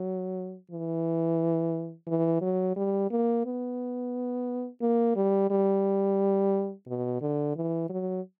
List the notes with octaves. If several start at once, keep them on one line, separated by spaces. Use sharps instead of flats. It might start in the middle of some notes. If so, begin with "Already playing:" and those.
Already playing: F#3
E3
E3
F#3
G3
A#3
B3
A#3
G3
G3
B2
D3
E3
F#3